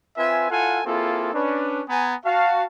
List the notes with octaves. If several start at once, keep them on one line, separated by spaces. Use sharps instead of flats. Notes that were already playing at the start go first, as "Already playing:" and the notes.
C4 F4 B4 E5 G#5
E4 F4 A4 F5 F#5 G#5
A#3 C4 E4 F4 G#4 A4
C#4 D4 B4
B3 G#5 A#5
F#4 F5 A5